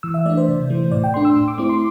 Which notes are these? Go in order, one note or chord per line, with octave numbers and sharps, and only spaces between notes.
E3 E6
E5
A3 D4 D5
C5
C3
E3 A3
A2 D5
G5
A3 D4 C6
E6
A2
D6
A3 C4 E4 D6
C6